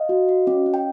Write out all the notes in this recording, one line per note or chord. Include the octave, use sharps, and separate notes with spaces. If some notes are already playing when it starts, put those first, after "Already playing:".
Already playing: D#5 F5
F#4
F#4
C#4
C#4
G5